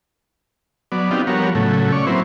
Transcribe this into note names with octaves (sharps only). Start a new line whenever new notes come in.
F#3 B3 D5
B3 C4 D4 D#4 F4 G4
F3 G3 B3 F#4 A#4 C#5
A2 C#3 F#3 A3
C#4 D5 C#6
F#3 A#3 C4 E4 B4 C5